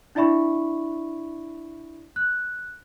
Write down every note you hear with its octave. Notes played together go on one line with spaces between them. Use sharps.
D4 E4 D5 E5 B5 C#6
F#6